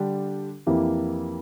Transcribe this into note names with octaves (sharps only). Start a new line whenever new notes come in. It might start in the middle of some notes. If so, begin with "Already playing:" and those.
Already playing: D3 G3 D4 G4
F2 E3 A#3 E4 G4